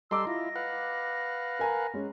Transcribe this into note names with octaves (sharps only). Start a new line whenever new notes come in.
G3 A4 D#5 A#5 C6 D6 E6
E4 F4 A#6
B4 F5 F#5
A#4 G#5 A#5
G#3 C#4